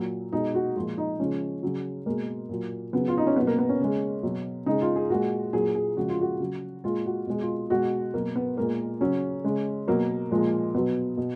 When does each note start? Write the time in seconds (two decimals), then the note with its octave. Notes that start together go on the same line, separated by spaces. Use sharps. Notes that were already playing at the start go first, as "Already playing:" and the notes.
Already playing: A#2 F#3
0.33 B2 G#3 D#4
0.55 F#4
0.76 A#2 F3 G#3 F4
0.98 D#4
1.19 C#3 F3 G#3 C#4
1.63 C#3 F#3
2.06 B2 G#3 A#3
2.49 A#2 F#3
2.93 C#3 F#3 B3
3.08 F4
3.18 D#4
3.27 C#4
3.36 F#3 B3
3.41 B2
3.47 A#3
3.59 B3
3.69 C#4
3.80 C#3 G#3
4.23 B2 F#3
4.66 C#3 G#3 D#4
4.81 F4
4.96 G#4
5.10 A#2 G#3 F#4
5.53 A#2 F#3 G#4
5.75 G#4
5.97 C#3 F3 G#3 F#4
6.09 F4
6.21 F#4
6.40 C#3 F#3
6.84 A#2 G#3 F4
7.06 F#4
7.27 B2 G#3
7.42 F4
7.70 B2 G#3 F#4
8.14 B2 F#3 A#3
8.36 B3
8.57 A#2 G#3 A#3
9.01 C#3 F#3 C#4
9.44 C#3 G#3
9.88 B2 F#3 A#3
10.31 A#2 F3 G#3
10.74 B2 F#3 B3
11.17 B2